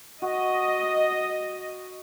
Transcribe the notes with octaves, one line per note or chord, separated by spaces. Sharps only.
F#4 D#5